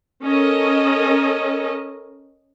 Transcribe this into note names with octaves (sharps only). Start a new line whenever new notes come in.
C#4 A4 A#4 D#5